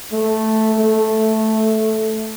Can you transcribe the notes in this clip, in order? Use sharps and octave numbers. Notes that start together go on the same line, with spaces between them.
A3
A3